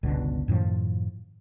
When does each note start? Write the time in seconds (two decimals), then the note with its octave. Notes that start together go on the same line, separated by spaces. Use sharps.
0.03 G1 C#2 B2 D3
0.48 F#2 A2 D#3 F3